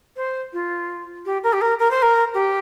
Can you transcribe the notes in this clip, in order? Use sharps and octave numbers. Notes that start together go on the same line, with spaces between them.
C5
F4
G4
A#4
G4
A#4
A#4
C5
A#4
G4